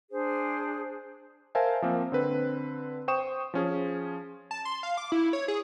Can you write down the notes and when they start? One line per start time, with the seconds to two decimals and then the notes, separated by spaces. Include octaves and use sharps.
0.11 D4 G#4 C5
1.55 A#4 C5 E5 F5 G#5 A5
1.82 F3 A#3 C4
2.12 D3 C4 B4
3.08 C5 G5 C#6 D#6 E7
3.54 F3 C#4 G#4
4.51 A5
4.65 C6
4.83 F5
4.97 D6
5.12 E4
5.33 C#5
5.48 G#4